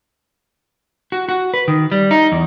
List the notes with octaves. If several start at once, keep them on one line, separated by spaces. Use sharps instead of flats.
F#4
F#4
B4
D#3
G3
D#4
E2